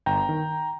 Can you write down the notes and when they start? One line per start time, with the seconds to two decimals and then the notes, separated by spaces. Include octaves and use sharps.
0.06 G1 G5 A#5
0.29 D#3